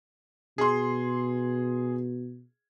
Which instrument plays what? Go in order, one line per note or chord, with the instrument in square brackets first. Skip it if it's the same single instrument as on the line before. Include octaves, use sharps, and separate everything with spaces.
[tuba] B2 [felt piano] G#4 C6